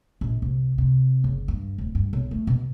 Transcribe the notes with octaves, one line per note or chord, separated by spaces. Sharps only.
A#1
C2
C3
F#1
G2
D1
G2
B1
A3
B2